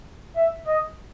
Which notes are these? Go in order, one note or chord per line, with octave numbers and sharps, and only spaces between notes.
E5
D#5